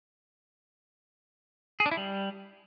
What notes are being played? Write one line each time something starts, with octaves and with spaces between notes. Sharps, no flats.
G#4
D4
E4
G3